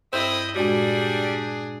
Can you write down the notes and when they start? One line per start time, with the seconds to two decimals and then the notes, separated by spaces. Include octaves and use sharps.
0.13 G2 C4 E4 D#5
0.55 A#2 G3 G#3 D4 F#4 G#4